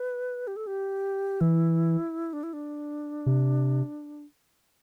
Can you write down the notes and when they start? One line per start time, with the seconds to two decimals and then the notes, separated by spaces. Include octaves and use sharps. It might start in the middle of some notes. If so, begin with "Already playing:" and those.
Already playing: B4
0.47 G4
0.56 A4
0.67 G4
1.41 E3 E4
2.33 D4
2.43 E4
2.53 D4
3.26 C3